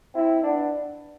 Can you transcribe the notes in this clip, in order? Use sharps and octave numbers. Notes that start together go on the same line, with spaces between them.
C4 E4
B3 D4